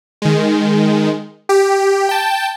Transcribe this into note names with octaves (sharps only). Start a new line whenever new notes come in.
D#3 G#3
G4
G5 A5